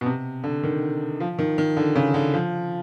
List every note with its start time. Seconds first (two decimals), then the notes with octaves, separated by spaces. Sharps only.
0.01 B2
0.06 C3
0.44 D3
0.63 D#3
1.20 F3
1.39 D#3
1.58 D#3
1.77 D3
1.95 C#3
2.14 D3
2.34 F3